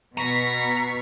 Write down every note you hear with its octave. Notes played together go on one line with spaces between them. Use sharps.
B2 A#5 C#6 B6 C7